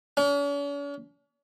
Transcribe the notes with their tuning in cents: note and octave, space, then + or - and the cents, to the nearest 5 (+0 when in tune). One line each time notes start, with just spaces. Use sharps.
C#4 +45